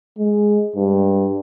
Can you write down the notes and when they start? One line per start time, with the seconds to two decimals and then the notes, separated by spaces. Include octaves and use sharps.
0.18 G#3
0.76 G2